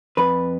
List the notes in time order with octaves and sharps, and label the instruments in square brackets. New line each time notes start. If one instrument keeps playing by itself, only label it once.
[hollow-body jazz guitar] F2 B4